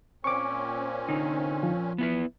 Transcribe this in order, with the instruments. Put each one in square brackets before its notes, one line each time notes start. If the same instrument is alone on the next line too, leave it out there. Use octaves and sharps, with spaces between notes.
[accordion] A#2 C4 C#4 [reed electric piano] C#6 D6
[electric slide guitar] D3 D#4
[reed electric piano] F3
[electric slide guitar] B3 E4 B4